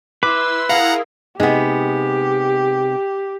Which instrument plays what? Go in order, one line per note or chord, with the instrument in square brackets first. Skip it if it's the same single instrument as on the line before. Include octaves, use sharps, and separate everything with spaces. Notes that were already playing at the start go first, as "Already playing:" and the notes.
[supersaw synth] E4 C6 E6 [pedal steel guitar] B4 [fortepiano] D6
[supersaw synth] E4 G#4 A#4 [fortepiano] F5 [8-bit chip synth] F#5 A#5
[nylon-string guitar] C3 D#4 [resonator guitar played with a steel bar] G#3 B3 [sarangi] G4